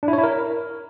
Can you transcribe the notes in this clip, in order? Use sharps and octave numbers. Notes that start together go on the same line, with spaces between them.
D4
E4
C#5
E4
A#4